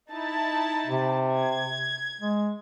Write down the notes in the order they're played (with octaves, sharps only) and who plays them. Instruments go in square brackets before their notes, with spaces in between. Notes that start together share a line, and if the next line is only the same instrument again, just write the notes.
[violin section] D#4 E4 A5
[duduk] C3
[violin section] G#6
[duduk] G#3